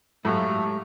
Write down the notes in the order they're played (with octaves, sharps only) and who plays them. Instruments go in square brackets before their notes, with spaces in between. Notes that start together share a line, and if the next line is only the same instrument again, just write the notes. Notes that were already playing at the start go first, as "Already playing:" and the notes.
[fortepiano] A2 F#3 [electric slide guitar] G#3 G4 F5 [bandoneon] A3